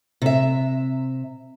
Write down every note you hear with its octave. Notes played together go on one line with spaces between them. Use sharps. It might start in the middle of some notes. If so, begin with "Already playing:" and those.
C3 E5